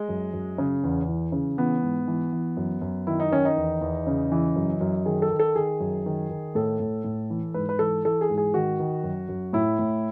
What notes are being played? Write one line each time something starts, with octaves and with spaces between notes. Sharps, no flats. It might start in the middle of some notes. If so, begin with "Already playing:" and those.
Already playing: G#3
F#2
F#2
C#3
E2
E3
C#3
E3 B3
G#2
E3
E3
F#2
F#2
D#3 E4
D#4
D#3 C#4
D#4
E2
E2
C#3
E3
F#2
F#2
D#3 G#4
A4
D#3
A4
D#3 G#4
F#2
D#3
D#3
A2 A4
A2
A2
E3
G#2 B4
B4
E3 A4
E3 A4
G#4
G#2
G#4
D#3 F#4
D#3
F#2
F#2
A2 E4
A2